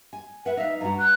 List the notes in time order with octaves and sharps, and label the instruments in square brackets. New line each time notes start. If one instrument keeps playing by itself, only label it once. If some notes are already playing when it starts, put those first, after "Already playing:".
[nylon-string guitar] G#5
[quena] B4 [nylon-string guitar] E5 F#5
[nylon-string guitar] D#4 F5 [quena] E5
[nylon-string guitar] G2 F#4 [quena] A#5
[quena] F#6